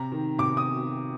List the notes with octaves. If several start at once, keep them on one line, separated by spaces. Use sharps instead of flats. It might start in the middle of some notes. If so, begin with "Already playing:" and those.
Already playing: C3 A#5
D#3
C3 D6
D#6